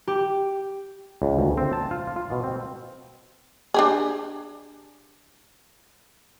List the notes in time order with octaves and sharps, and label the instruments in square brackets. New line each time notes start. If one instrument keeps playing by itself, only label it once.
[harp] G4
[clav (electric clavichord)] C#2
D2
C4
A5
F4
F4
B2
C4
[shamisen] D4 G4 G#4